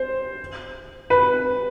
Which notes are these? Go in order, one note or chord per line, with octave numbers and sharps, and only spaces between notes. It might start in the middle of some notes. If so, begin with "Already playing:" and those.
Already playing: C5
B4